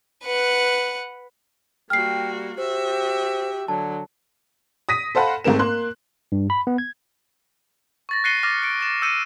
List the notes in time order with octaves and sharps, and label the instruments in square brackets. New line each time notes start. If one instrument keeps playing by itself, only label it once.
[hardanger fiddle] B4 F#5
[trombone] G3 [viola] A#3 F#4 [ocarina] G5 [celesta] F6 C7
[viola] F#4 E5 [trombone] G4 [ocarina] C5
[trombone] D3 [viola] F#3 [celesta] A5
[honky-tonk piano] D#6 A#6 B6 D#7
A4 C5 F5 F#5 B5
G#2 A3 C4 A#4 E7
A#3 C6 F#6
[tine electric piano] G2
B5
B3
G#6
[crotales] C#6 A6 A#6
F#6 A#6 C7 C#7 D#7 G7
D6 F6 A6 A#6
A6 C#7 D7
A6 E7
E6 G6 C#7 D#7